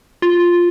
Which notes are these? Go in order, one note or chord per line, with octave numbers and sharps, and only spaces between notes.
F4